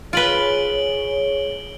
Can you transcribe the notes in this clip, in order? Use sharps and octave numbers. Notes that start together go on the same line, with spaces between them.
F4 G#4 B4 C#5 D7 F#7 G7